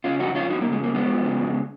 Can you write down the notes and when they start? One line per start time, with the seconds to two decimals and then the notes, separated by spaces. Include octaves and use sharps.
0.04 C#3 C#4 F4
0.20 F2 D#4 F#4
0.35 F2 C#4 F4
0.50 F3 D#4 F#4
0.61 A#3
0.65 C#3
0.72 G#3
0.80 F2 A#3
0.94 F2 G#3 B3
1.09 F3
1.25 C#3
1.41 F2